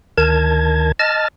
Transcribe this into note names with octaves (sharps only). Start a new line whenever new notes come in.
D2 D#3 A#4 A5 G#6
D#5 A5 F6 A6